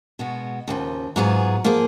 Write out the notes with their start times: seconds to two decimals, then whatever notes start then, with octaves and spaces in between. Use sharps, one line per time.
0.19 B2 G#3 B3 F#4
0.68 D#2 C#3 F3
1.16 G#2 F#3 B3 F4 G#4
1.64 F3 A#3 F4 G#4